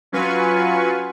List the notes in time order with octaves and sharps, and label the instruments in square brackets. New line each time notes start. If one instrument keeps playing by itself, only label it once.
[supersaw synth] F#3 C#4 F4 B4 G#5 C#6